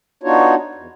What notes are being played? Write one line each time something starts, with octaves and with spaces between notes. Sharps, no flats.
B3 D4 D#4 F4 F#4 C#5
E2